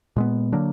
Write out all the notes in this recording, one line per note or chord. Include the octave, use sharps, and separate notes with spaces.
A#2 G#3 B3
D3 F#3 A#3 D4